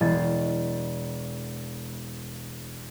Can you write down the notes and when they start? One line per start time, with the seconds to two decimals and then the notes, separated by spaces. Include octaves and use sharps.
0.01 E1 A6 C7